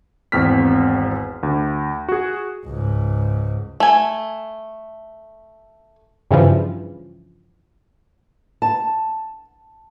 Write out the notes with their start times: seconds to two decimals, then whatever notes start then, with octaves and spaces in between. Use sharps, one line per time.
0.32 G#1 E2 C4 F6 B6
1.43 D2
2.09 F#4 G#4
2.65 C#2 G#2
3.80 A3 G#5
6.31 G2 C#3 E3 F3
8.62 A5